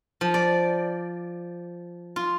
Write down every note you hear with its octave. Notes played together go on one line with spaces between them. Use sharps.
F3
D5
F4